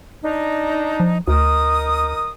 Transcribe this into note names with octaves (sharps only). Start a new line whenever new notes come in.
D4 D#4
F3
D2 D#4 A#4 D#6